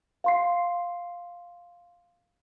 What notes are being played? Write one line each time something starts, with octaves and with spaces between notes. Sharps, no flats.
F5 C6 C7